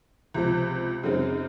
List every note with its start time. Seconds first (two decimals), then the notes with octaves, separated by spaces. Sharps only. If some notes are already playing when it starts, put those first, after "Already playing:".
0.34 C#2 C3 F3
1.03 F#2 C#3 G#3 C4 D#4